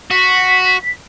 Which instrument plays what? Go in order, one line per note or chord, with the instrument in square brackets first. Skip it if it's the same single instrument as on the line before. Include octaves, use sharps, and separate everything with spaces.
[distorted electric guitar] F#4 [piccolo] B6